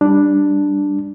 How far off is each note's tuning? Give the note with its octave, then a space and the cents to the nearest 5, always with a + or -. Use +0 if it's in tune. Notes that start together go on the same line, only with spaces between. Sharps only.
G3 +0 D4 +0